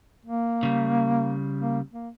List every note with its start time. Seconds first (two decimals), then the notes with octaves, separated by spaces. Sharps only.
0.25 A#3
0.63 C#3 G3
1.58 A#3
1.91 A#3